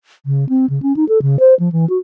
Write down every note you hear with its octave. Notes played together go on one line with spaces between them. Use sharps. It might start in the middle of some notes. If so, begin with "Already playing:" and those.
C#3
C4
C#3
C#4
D#4
A4
C#3
C5
F3
E3
F#4